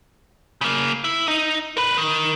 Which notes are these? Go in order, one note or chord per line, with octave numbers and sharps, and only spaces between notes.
C#3 A#3
E4
D#4
A#4 B4
D#3